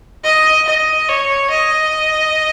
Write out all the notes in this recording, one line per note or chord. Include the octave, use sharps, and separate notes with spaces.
D#5
D#5
C#5
D#5